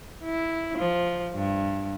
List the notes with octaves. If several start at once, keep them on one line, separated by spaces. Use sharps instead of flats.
E4
F3
G2